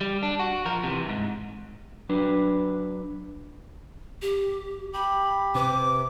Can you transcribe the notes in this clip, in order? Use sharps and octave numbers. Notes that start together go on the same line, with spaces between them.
G3
D4
F#4
F3 A#4
C3 E3
F2 G#2
F#3 D4 B4
G4
G4 B5
C3 B4 D6